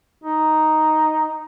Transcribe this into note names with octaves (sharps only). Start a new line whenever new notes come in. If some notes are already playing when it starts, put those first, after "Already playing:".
D#4